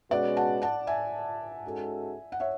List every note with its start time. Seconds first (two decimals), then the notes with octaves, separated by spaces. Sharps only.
0.11 B2 G#3 C#4 F#4 B4 D5 F#5
0.37 F#5 A5
0.62 F#5 A5
0.87 E5 G#5
1.64 G#2 G#3 C#4 F#4 A4
2.32 F#5
2.40 C#5 E5